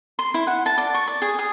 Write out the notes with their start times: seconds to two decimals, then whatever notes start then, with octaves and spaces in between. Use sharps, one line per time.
0.19 C6
0.34 E4
0.47 F#5
0.66 A5
0.78 D5
0.94 C#6
1.08 D5
1.22 G#4
1.39 G#4